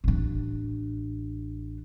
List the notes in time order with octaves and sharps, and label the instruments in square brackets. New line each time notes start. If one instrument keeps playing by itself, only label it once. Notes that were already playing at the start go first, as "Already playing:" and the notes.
[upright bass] A1 D4